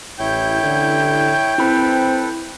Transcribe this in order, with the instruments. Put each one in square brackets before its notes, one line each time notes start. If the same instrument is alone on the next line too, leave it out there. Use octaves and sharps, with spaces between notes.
[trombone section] A1 [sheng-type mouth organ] E4 C#5 G6 [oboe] G5
[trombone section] A1 D3
[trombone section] C4 [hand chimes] E4 B5 [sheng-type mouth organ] A4 B4